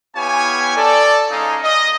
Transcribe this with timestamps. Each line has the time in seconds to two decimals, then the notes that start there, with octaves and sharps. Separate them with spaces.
0.16 B3 E4 G4 C#5 F5 G#5
0.76 A4 D5
1.30 G#3 C#4 D#4 G#4 F5 D#6
1.63 D#5